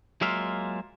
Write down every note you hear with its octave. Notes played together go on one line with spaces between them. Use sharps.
F#3 G#3 A#3 F4 E5 F5